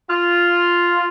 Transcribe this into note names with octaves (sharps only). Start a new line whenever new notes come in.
F4